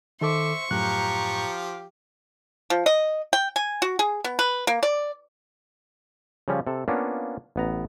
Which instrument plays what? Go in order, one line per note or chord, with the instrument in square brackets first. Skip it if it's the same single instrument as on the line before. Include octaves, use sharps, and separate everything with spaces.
[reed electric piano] D#3 A4 D6 [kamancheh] C5 E5 [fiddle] C#6
[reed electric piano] F#2 A2 F#6 [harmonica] F3 G4 F5 [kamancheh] A#5
[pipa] F3
D#5
G5
G#5
F#4
G#4
B3
B4
A#3
D5
[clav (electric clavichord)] C#3 F3 G3 C#4
C3 A4
A#3 B3 C#4 D4 F4
A1 B3 A#5